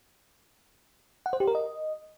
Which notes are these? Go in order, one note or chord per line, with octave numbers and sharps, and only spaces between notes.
F#5
C5
G4
A#4
D#5